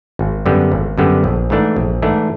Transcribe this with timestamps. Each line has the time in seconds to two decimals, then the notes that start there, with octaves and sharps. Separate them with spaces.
0.19 G#1
0.46 F#2 D3 G3 B3
0.72 G#1
0.98 F#2 D3 G3 B3
1.24 A#1
1.50 G#2 E3 A3 D4
1.76 A#1
2.02 G#2 E3 A3 D4